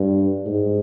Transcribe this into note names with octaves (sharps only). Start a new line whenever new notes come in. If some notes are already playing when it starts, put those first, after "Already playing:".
Already playing: G2
G#2